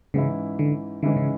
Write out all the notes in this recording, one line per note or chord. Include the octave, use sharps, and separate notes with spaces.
G#2 C#3 E3 G#3 C#4 E4
D3
G#2 D3 E3 G#3 C#4 E4
C#3